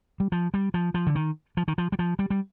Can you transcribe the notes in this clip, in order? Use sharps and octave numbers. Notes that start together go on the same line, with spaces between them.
G3
F3
G3
F3
F3
D3
D#3
F3
D#3
F3
G3
F3
G3
G3